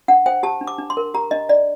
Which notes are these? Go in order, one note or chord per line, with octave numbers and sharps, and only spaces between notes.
D4 F#5
C5 G5
G4 A5
D4
D6
D4
C6
A#4
G4 A#5
D4 D#5
D4 D5